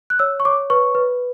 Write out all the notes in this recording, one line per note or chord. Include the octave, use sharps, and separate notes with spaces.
F#6
C#5 E6
C#6
C#5 D6
B4 C#6
B4